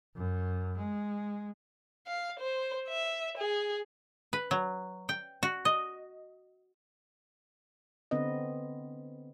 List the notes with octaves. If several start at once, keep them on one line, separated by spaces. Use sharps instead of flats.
F#2
G#3
F5
C5
E5
G#4
B4
F#3
G5
F#4
D#5
D3 B3 C4 B4 D#5